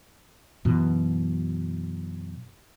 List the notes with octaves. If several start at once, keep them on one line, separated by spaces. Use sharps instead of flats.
F#2 B2 E3